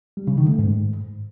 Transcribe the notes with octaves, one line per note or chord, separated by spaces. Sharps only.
G3
C#3
D#3
A3
G#2